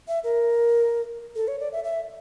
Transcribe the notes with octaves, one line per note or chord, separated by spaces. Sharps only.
E5
A#4
A4
C#5
D5
E5
E5